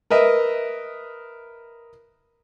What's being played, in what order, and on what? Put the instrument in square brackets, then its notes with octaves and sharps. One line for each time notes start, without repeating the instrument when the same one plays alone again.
[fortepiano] A#4 B4 D#5 E5